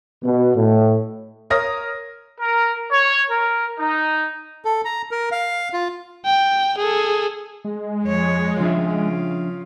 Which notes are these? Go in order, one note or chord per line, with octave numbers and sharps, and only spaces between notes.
B2
A2
A#4 C#5 D#6 F6 A#6
A#4
C#5
A#4
D#4
A4
A#5
A#4
F5
F4
G5
G#4 A4
G#3
F2 C#5
C#3 F3 D4 F4 E5